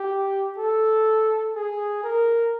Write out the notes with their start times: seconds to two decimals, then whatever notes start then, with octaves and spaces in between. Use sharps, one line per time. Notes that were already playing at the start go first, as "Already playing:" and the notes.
Already playing: G4
0.58 A4
1.55 G#4
2.04 A#4